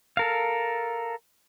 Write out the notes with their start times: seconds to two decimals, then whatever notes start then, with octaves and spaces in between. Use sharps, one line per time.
0.17 A4 A#4 F5